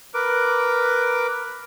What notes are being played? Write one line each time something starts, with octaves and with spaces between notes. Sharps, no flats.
A#4 B4 D6